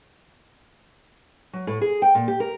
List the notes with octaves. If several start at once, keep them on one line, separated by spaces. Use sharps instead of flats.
F#3
A2
G#4
G5
A#2
G4
A#4